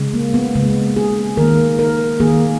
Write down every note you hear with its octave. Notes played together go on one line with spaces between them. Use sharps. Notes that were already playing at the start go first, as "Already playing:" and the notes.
Already playing: C#3 G#3
A#3
B3
C#3 G#3 B3
G#4
D#3 A#3 A#4
A#4
D#3 A#3 G#4